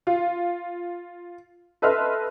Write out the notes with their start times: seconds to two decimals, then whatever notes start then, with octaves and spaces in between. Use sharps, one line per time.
0.07 F4
1.82 A4 B4 D#5 E5 C6 F6